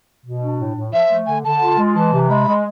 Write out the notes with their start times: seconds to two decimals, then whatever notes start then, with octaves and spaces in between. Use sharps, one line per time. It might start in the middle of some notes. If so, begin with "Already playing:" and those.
0.25 B2
0.42 D4
0.59 A2
0.76 A2
0.93 F3 E5
1.10 A3
1.27 D3 G#5
1.44 D3 A5
1.62 F4
1.78 G#3
1.96 E3 A5
2.12 C3
2.29 G#3 B5
2.47 G#3